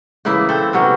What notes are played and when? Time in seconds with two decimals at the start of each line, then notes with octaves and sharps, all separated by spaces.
0.25 C#3 E3 A#3 E4
0.49 C4 A4
0.73 C3 F#3 B3 C#4